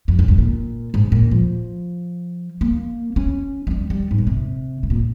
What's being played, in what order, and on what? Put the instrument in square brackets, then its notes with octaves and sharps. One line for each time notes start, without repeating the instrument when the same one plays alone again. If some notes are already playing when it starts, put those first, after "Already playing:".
[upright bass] F2
G2
G#2
A#2
G#2
A#2
F3
A#3
C#4
G#3
G3
G3
G#2
A#2
C3
C3
A#2